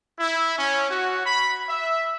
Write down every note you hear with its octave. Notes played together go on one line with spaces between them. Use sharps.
E4
C#4
F#4
B5
E5